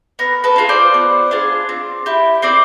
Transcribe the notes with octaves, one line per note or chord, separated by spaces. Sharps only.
B3 A#4
A4 B4
D4 F4 G#4
C5 D5
B3
D4 F4 G#4
C4
E4 G4
C4 C5 D5